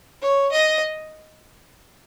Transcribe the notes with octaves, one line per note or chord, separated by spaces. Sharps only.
C#5
D#5